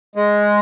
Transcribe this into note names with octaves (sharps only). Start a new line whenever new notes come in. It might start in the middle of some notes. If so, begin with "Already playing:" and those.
G#3